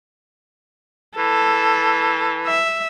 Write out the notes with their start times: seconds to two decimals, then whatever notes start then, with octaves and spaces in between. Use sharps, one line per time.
1.18 E3 A4
2.47 E5